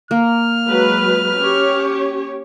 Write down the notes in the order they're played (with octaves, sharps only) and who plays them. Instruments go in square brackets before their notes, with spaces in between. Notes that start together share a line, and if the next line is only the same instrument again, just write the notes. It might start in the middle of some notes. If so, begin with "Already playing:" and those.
[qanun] A#3 [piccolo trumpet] F6
[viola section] F#3 G#3 B4
C#4 G4 C#5